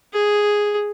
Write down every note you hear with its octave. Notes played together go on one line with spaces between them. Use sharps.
G#4